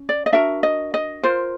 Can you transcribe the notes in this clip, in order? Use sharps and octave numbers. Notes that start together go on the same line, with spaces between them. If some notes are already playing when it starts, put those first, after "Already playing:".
Already playing: C#4
D5
D#5
D4 F#4 A#4 E5
D#5
D#5
F4 A#4 C5